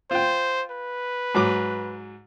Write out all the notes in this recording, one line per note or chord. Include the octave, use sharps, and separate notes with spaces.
F4 C5 G5
B4
G#2 F#3 D6